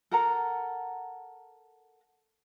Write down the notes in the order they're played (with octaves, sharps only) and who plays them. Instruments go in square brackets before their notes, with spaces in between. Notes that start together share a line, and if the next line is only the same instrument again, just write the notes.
[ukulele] A4 A#4 F#5 A#5